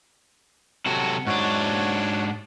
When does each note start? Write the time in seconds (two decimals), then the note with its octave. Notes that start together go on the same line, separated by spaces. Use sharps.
0.86 C3 F#3 F#4 A4
1.27 G#2 D4 F#4 C#5 F#5